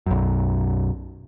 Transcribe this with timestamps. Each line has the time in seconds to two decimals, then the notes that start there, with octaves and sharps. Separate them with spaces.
0.06 B1 F#2